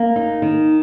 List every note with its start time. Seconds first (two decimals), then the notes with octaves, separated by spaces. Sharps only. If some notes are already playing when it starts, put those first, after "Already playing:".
Already playing: A#3
0.16 D#4
0.42 D#3